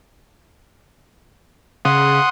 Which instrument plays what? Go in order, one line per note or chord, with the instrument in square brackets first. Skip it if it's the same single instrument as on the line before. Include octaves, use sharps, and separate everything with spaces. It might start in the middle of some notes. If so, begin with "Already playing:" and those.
[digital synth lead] C#3 [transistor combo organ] F#5 C6 D#6